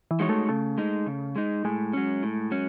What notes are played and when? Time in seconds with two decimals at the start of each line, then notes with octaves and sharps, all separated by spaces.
0.11 E3
0.20 G#3 D#4 F#4 C#5
0.29 A3
0.49 C#3 A3
0.78 G#3 D#4
1.06 C#3
1.36 G#3 D#4
1.65 A2 G#3
1.93 F#3 C#4
2.23 A2
2.51 F#3 C#4